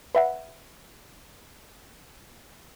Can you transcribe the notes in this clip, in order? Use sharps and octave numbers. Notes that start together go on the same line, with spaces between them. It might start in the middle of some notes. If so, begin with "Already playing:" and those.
B4 E5 F#5